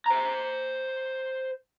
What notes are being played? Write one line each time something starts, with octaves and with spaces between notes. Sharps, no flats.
C5 A#5